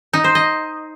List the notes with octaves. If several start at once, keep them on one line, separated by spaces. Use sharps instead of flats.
D#4
C5
D#5